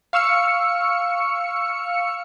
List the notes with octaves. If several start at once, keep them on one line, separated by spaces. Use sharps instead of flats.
F5 C#6 E6 F6 C#7